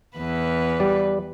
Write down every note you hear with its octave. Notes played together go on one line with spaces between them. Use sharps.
E2 B4
G3 D5